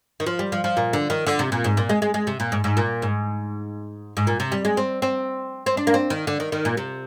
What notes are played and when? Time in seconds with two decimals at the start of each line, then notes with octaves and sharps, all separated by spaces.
0.20 D#3
0.26 F3
0.39 G3
0.52 F3
0.64 F3
0.77 A#2
0.93 D3
1.10 D#3
1.27 D3
1.39 C3
1.52 A#2
1.64 G#2
1.77 A#2
1.89 G#3
2.02 G#3
2.14 G#3
2.27 C3
2.40 A#2
2.52 G#2
2.64 G#2
2.77 A#2
3.02 G#2
4.17 G#2
4.27 A#2
4.40 C3
4.52 G3
4.65 G#3
4.77 C4
5.02 C4
5.66 C4
5.77 D4
5.87 A#3
5.94 C4
6.10 D#3
6.27 D3
6.40 D#3
6.52 D#3
6.65 A#2
6.77 C3